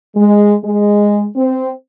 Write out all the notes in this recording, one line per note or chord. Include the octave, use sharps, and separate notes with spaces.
G#3
G#3
C4